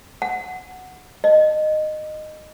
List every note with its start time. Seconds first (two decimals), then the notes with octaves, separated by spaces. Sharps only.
0.22 F#5
1.24 D#5